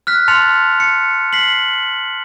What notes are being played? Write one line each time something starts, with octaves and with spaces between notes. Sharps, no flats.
F6 F#6 B6
A5 C6 F6 A6 C#7 F7
C#7
B6 C7 F#7